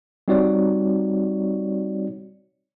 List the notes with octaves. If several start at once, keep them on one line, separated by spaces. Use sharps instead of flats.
G3 C4 D#4 F#4 C#5 D5